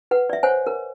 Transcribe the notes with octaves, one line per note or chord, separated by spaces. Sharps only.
B4 F#5
D5 E5
C5 C#5 F#5 G#5
A#4